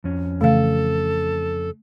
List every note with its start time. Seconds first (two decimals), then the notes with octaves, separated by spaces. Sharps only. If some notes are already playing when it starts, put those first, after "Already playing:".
0.04 F2 C#4
0.41 C#3 E3 A3 A4 F5